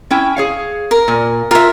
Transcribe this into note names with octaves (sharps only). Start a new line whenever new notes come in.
C#4 E4 G5
G#4 C#5 F5
A#4
A#2
F4 A#4 E5